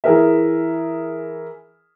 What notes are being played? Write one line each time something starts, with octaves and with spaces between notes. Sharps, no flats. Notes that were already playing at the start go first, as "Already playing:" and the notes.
E3 G#4 A#4 E5